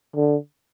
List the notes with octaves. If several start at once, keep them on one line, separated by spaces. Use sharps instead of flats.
D3